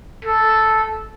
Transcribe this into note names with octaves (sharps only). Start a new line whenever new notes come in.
A4